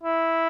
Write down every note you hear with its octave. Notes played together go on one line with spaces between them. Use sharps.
E4